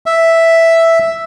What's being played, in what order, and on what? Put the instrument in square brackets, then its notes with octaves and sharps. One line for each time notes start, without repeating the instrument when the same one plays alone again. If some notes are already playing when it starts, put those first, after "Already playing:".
[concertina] E5